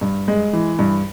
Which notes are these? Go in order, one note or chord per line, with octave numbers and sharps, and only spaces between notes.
G2
G#3
E3
G2